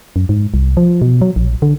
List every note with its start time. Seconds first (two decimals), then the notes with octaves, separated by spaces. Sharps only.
0.16 F#2
0.29 G#2
0.54 C2
0.77 F3
1.02 B2
1.21 F#3
1.36 A#1
1.62 D3